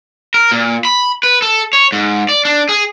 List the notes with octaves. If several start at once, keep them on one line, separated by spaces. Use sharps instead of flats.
A#4
A#2
B5
B4
A4
C#5
G#2
D5
D4
G#4